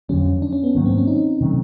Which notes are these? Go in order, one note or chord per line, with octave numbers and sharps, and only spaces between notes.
F2 D3 F#3 C#4
D4
C#4
B3
G#2 D#3 F#3 A#3
C4
C#4
D#4
C3 D#3 F#3 A3